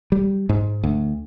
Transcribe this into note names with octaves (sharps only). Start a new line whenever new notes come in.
G3
G#2
D2